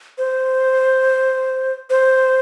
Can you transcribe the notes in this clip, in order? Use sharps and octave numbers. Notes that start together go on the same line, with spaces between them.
C5
C5